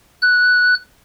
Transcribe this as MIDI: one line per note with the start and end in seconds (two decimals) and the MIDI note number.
0.22 0.75 90